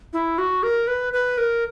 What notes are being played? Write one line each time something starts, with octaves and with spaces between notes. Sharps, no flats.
E4
F#4
A#4
B4
B4
A#4